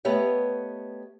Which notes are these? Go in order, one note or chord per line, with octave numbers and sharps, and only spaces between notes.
A3 B3 G4 C#5 D#5